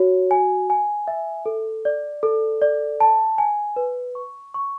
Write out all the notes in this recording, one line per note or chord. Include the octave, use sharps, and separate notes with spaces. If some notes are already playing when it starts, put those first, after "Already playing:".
Already playing: F#4 C#5
G#5
G#5
E5
A4
D5
A4
D5
A5
G#5
B4
C#6
C#6